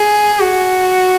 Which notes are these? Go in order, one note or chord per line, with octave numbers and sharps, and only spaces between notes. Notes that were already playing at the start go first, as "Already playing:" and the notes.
Already playing: G#4
F#4